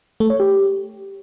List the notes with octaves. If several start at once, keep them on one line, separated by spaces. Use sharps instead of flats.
A3
C#5
G4